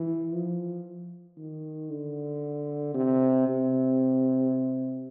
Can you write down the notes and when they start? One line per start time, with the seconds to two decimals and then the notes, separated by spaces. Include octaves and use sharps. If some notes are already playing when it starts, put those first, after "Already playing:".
Already playing: E3
0.34 F3
1.37 D#3
1.90 D3
2.94 C3
3.47 C3